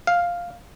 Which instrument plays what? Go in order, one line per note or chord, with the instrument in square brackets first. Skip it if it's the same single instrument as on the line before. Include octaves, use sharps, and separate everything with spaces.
[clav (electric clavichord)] F5